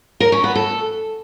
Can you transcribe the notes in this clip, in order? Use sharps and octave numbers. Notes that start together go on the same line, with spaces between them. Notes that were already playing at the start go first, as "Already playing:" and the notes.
A#4
C#4
B3
A4